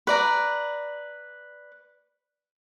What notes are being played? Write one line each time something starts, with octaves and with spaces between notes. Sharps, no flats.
B4 D5 A#5